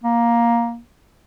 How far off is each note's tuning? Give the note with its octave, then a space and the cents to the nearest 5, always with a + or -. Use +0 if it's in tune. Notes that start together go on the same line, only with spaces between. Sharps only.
A#3 +10